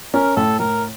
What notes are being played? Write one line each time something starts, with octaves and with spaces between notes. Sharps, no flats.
C#4 A#4
A2 A4
A2 A#4